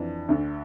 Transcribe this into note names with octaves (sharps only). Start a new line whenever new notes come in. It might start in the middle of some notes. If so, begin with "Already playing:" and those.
Already playing: F2 E3 D4
D2 D3